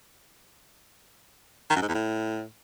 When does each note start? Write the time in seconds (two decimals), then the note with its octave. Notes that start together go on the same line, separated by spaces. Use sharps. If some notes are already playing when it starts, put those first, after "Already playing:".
1.70 D#3
1.76 F#2
1.82 G#2
1.88 E2
1.94 A2